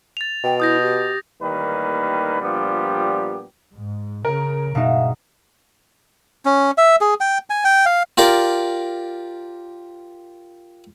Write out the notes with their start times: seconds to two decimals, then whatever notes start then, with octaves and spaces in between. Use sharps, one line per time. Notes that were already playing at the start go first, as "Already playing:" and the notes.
0.17 A6 F7
0.44 B2 G5
0.60 E4 D#6 G6 A#6
0.81 G4
1.41 A1 D#2 D#3 G3 A#3 B4
2.41 A#2 F3 G3 B3 D4 G4
3.75 G#2
4.25 C#3 A#4
4.75 G2 B2 G#3 D#4 E5 F5
6.45 C#4
6.78 E5
7.01 G#4
7.20 G5
7.50 G#5
7.65 G5
7.86 F5
8.18 F4 G4 A#4 D5